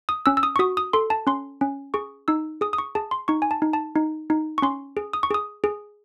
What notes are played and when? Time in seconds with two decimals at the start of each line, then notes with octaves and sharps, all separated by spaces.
0.09 D#6
0.26 C#4 E6
0.37 E6
0.43 D#6
0.56 C#6
0.59 F#4 D#6
0.77 D#6
0.93 A4 C6
1.10 A5
1.27 C#4 C6
1.61 C#4
1.94 G#4 C#6
2.28 D#4 E6
2.61 G#4 D#6
2.73 D#6
2.78 C#6
2.95 G#4 A5
3.11 C6
3.28 D#4 C#6
3.42 G#5
3.51 A5
3.62 D#4
3.73 A5
3.96 D#4
4.30 D#4
4.58 C#6
4.62 C#4 C6
4.97 G#4
5.13 D#6
5.23 C#6
5.31 G#4 D#6
5.64 G#4